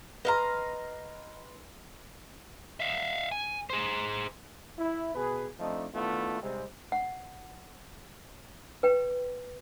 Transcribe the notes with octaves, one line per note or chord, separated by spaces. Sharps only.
B4 D#5 F5 A#5 C6
E5 F5
G#5
G#4 C5
E4
B2 G#4 B4
F3 A3 C4 D4 D#4
D#3 A3 B3 D4 E4 F4
G#2 C3 G3 G#3 C4
F#5
B4 G5